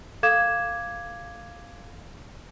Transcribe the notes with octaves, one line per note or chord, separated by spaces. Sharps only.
A4 F5 D6 G#6 E7